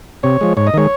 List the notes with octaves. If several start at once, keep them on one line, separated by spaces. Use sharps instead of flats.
C3 C#5
F3 G#3
G#2 C#5
D#5
D#3 G#3 C#5